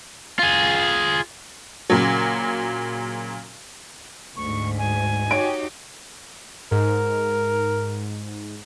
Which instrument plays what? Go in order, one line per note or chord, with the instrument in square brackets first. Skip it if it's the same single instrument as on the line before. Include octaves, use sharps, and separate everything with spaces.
[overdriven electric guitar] F4 G#4
[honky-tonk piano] A#2 C#3 F#3
[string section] D2 G#2 [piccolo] C#6
[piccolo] G#5
[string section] D#4 F#4 G4 [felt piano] C#5 D7
[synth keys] G#2 [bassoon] A#4